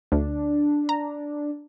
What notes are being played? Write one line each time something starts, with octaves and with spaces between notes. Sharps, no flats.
D2 D4
A#5